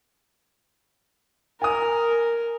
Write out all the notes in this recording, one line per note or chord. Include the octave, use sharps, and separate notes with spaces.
A#4 G#5 D#6